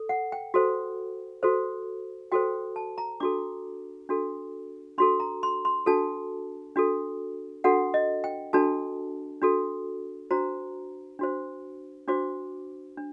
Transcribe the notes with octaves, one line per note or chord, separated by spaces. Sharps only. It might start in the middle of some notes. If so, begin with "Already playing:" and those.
Already playing: A4
F#5
G5
F#4 A4 C5
F#4 A4 C5
F#4 A4 C5 G5
A5
A#5
D4 F#4 A4 D6
D4 F#4 A4
D4 F#4 A4 C6
A#5
C6
C6
D4 F#4 A4 A5
D4 F#4 A4
D4 F#4 A4 F#5
D#5
G5
D4 F#4 A4 A5
D4 F#4 A4
D4 F#4 C5 A#5
D4 F#4 C5
D4 F#4 C5 D6
D4